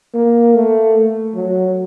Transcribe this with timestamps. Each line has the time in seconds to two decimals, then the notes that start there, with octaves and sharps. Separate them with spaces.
0.14 A#3
0.55 A3
1.35 F#3